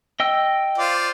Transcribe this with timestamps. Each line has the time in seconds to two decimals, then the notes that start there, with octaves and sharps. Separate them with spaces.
0.20 D#5 G5 E6
0.78 F4 C5 D5